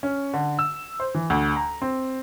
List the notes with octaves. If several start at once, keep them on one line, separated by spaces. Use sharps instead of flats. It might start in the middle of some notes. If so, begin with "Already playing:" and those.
C#4
D3
E6
C5
E3
D2
A#5
C4